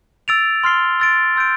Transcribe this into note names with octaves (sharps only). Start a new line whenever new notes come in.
E6 A6 D7 F7
C6 F6 C7 G7
E6 A6 D7
C6 E6 G6 D7